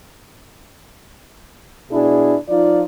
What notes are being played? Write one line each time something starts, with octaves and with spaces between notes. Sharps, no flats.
B2 D4 E4 G#4
F3 D#4 F4 D5